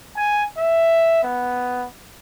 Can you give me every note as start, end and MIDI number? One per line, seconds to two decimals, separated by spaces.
0.16 0.43 80
0.58 1.23 76
1.23 1.86 59